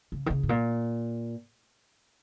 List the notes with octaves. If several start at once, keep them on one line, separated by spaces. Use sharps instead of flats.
C#3
D#3
C#3
G#2
A#2